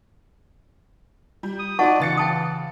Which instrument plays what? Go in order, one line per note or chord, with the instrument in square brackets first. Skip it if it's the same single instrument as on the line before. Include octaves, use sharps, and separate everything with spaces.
[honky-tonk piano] G3
[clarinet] D#6
[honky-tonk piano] D#4 F#4 C6 [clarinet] D5 [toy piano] F#5 A5 C#6
[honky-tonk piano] C#3 A6 C#7 [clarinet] E3
[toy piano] G5 A5 D#6